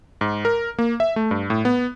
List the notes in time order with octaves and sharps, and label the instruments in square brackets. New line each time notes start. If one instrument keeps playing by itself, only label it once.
[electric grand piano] G#2
A#4
A#3
E5
A3
G2
A2
B3